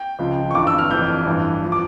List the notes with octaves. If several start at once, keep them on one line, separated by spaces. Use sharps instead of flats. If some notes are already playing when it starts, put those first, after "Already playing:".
Already playing: G5
C#2 C#3 F3
C#6
G1 G2 E3 D6
E6
F6
F1 F2 E3 G6
A1 G2 E3
F3
D6